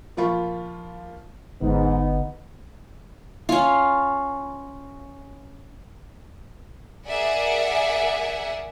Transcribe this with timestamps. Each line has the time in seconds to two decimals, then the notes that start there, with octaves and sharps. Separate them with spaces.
0.17 A#2 F3 A#3 F4 B5 C#6
1.61 G1 G#2 D3 B3 D#4
3.49 C#4 F4
7.07 G#4 A#4 D5 E5 F#5 G#5